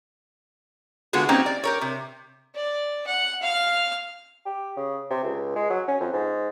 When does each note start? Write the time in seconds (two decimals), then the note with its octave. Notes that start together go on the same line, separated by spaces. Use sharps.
1.13 D3 G#3 B3 F4 F#4 G#4
1.29 G3 A#3 C4 C#4 D#4
1.46 D5
1.64 G4 A#4 C#5
1.81 C3
2.55 D5
3.07 F#5
3.42 F5 F6
4.46 G4
4.77 C#3
5.11 C3
5.24 C#2
5.56 G#3
5.70 F#3
5.88 C#4
6.01 F2
6.13 G#2